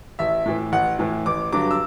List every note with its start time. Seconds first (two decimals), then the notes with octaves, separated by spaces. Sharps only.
0.19 A1 E5
0.46 A2 E3
0.72 A1 F#5
0.99 A2 E3
1.26 A1 D6
1.52 G2 D3 F#3 D6
1.71 E6